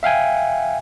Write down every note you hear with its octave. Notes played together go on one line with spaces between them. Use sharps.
E5 F5 G5 G#5